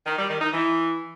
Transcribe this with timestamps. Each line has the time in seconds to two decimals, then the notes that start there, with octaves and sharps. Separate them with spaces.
0.06 D#3
0.18 G3
0.29 D#3
0.41 D#4
0.52 E3